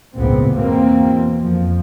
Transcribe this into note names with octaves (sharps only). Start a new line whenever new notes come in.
G#1 C#2 A#2 B3 C4
E2 B2 E3 A#3 C4
F2 F3